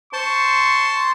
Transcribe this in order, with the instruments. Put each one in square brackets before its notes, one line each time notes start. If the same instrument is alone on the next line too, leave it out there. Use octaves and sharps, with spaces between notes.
[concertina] C5 A5 C6 [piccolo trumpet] C#6